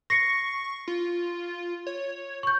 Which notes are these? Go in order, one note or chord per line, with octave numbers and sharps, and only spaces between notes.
C#6 A#6 C7 C#7
F4
C#5
C#6 G6